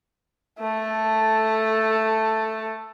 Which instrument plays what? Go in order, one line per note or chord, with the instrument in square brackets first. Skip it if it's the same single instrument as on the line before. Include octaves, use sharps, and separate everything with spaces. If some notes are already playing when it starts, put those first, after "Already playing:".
[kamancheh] A3 A4